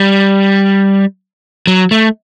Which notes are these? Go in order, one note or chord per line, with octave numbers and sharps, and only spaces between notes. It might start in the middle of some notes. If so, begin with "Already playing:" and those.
Already playing: G3
F#3
A3